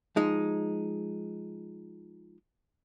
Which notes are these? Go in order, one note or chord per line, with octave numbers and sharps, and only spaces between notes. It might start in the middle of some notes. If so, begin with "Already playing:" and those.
F3 G#3 D#4